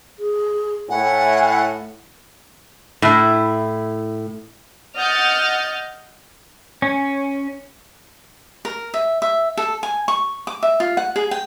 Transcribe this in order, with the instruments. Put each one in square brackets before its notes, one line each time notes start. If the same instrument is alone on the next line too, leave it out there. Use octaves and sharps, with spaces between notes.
[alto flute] G#4
[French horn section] A2 [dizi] F#5 [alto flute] G#5
[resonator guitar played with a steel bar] A2 E4
[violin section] D#5 F#5 F6 G6 A6
[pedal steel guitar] C#4
[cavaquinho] A#4
E5
E5
A4
G#5
C#6
D6
E5
F4
F#5
G#4
G5